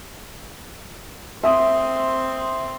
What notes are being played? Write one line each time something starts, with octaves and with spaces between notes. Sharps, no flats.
C4 E5 C6 D#6